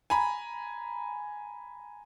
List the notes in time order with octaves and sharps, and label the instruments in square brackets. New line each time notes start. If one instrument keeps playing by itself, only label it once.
[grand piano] G#5 A#5 B5